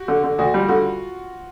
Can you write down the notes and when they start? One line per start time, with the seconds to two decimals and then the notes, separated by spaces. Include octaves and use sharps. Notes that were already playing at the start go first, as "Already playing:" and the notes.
Already playing: F#4 G4
0.08 D3
0.24 D3
0.38 D2 F#4
0.54 G3 F4
0.68 D3 F#4